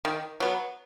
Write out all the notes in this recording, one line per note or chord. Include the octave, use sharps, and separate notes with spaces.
D#3
F#3 B3